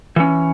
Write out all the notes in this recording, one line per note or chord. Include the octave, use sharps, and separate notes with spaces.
E3 C#4